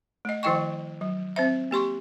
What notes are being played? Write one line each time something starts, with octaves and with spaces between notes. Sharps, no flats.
A3 D#5
D#3 F3 E4 D#5 G5 C#6
F#3
C4 C5 E5
A#3 G4 C6 C#6